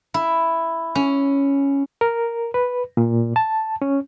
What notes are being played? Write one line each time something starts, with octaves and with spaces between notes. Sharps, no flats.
E4
C#4
A#4
B4
A#2
A5
C#4